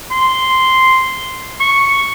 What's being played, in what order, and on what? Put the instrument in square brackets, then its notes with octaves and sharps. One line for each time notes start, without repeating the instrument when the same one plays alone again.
[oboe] C6
C#6